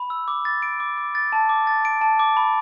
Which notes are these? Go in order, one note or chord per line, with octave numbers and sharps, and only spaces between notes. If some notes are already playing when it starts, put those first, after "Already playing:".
Already playing: B5
E6
D6
A6
D7
D6
D6
A6
A5
D6
A6
D7
A5
D6
B5